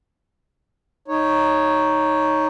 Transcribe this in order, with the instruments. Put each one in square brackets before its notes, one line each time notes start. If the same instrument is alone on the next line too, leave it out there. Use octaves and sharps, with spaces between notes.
[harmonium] D#4 C#5